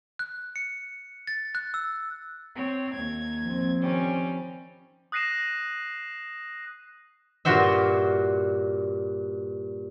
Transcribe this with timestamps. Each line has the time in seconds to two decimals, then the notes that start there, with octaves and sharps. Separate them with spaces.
0.19 F#6
0.56 C#7
1.27 A6
1.55 F#6
1.74 E6
2.54 C4 C#5
2.93 D#2 G#6
3.43 F3 C4
3.80 D#3 G3 C#4
5.12 D#6 F#6 A#6 C7 D#7 E7
7.45 G2 A#2 F4 F#4 C5 E5